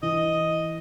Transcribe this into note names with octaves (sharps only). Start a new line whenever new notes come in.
E3 D#5